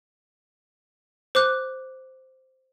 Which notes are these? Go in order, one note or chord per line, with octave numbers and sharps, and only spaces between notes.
C5 D6 F#6